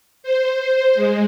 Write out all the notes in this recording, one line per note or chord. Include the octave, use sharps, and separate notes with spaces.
C5
G#3